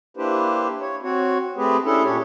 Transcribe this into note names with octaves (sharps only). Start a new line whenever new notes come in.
A#3 D4 E4 G4 B4 C5
C#5
C4 F#4 C#5
A3 C4 G4 G#4 B4
C#4 D4 E4 G#4 A4
A#2 D4 G4 C#5